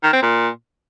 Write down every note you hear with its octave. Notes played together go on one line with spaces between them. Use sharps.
D#3
C4
A#2